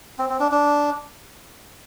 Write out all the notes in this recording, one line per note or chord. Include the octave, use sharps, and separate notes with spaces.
C4
C4
D4
D4